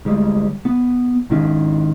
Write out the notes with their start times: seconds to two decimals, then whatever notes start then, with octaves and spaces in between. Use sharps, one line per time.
0.05 D2 G3 G#3
0.65 B3
1.30 G#1 G#2 D#3 C#4